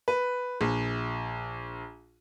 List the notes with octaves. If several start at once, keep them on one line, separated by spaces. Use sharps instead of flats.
B4
A#1